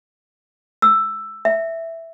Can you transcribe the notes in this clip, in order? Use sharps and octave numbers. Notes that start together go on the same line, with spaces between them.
E6
E5